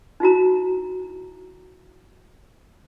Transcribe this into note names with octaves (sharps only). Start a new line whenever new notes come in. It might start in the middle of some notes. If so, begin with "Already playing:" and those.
D#4 E4 F#4 A#5